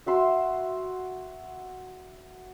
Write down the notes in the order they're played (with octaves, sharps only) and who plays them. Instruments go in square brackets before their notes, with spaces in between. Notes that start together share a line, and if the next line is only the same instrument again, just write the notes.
[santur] F#4 E5 C6